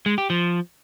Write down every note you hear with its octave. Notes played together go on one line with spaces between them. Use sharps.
G#3
G4
F3